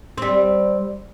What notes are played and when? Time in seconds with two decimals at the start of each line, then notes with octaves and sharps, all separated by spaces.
0.18 G3 C4